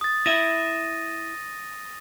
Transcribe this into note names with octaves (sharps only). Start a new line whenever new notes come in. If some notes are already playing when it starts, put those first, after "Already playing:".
D#6 A6
E4 E5 A#6 D#7